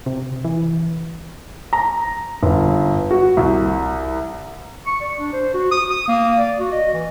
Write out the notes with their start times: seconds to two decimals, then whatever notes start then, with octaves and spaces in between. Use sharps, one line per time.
0.06 C3
0.45 E3
1.73 A#5
2.43 G1
3.11 F#4
3.37 C2
4.86 C#6
5.01 D5
5.19 D4
5.33 C5
5.54 F#4
5.72 D#6
5.89 D#6
6.08 A#3
6.37 D5
6.59 F#4
6.72 D#5
6.93 E3